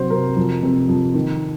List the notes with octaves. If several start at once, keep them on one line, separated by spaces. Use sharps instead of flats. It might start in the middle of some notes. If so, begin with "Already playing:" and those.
Already playing: C3 F#3 C5
C3 A#4
F2
C3
F2
D#3